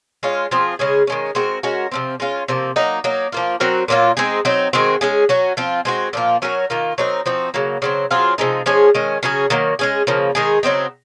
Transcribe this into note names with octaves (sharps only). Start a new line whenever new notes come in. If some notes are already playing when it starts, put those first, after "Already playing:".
G#3 C#4 F4
F3 C4 F4 G#4
C#3 G#3 C#4 G#4
D#3 G#3 C#4
G#3 C4 F#4 A#4
G#3 C#4 F#4 A#4
C3 F3 C4
G#3 C#4 F4
C3 F3 A#3
F#3 A#3 D#4
F#3 A#3 D#4
F3 A#3 F4
F#3 C4 F#4 A#4
A#2 F#3 A#3 F4
G#3 C4 D#4 G#4
F#3 C4 D#4
D#3 G#3 C4 F#4
G#3 C#4 G#4
F#3 C#4 F#4
F3 C4 F4
G#3 C4 F#4
A#2 F3 A#3 F4
F#3 C#4 F#4 A#4
D#3 A#3 F4
F#3 C4 D#4 A#4
F3 C4 D#4 F#4
C#3 F#3 A#3
C#3 F#3 C4
F#3 C4 F4 G#4
C3 F3 G#3 D#4
F3 G#3 C#4 G#4
D#3 G#3 C#4
C#3 F#3 C#4 G#4
D#3 F#3 A#3
G#3 C#4 G#4
C#3 F3 A#3
D#3 G#3 D#4 G#4
C#3 F#3 C4 D#4